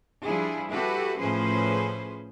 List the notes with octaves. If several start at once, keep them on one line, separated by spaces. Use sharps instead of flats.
F3 G3 D4 E4 G#4
E4 F#4 G4 A4 B4
A2 F3 C#4 G#4 B4 C5